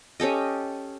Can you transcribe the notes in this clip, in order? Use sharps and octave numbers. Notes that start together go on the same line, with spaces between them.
C#4 G4 A4 D#5